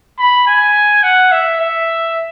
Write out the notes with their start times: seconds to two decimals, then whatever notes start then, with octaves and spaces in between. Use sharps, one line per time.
0.19 B5
0.47 G#5
1.03 F#5
1.32 E5
1.60 E5